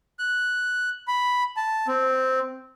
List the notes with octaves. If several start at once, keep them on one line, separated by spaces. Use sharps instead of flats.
F#6
B5
A5
C4